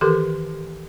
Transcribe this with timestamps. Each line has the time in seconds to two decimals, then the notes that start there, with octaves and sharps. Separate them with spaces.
0.01 D#3 E3 G4 A4 A#4